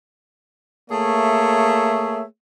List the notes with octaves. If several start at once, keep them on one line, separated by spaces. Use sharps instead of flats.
A3 A#3 G#4 C#5 E5